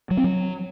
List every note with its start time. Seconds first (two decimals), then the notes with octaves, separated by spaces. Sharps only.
0.11 F#3
0.17 C4
0.24 F#3